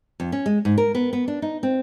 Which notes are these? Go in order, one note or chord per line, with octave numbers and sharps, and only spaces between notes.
F2
C#4
G#3
G#2
A#4
B3
B3
D4
D#4
C4